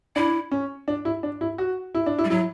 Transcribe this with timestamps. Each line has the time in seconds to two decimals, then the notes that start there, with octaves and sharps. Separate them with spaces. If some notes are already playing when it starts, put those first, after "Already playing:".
0.16 D4 E4
0.51 C#4
0.88 D4
1.05 E4
1.23 D4
1.41 E4
1.58 F#4
1.95 E4
2.06 D4
2.18 E4
2.24 G3
2.30 F#3 E4